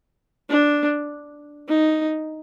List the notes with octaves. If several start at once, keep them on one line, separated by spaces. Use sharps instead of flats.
D4
D#4